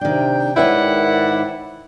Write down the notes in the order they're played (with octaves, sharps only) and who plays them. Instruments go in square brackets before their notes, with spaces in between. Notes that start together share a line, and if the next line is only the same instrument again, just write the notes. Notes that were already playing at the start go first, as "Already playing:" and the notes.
[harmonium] C3 [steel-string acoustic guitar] D#3 D4 [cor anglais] G5
[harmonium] G#2 D#3 D5 [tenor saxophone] E4 [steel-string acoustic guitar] B4 C#5 G5 [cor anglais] F#5